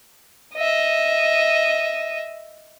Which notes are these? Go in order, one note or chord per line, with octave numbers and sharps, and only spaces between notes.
D#5 E5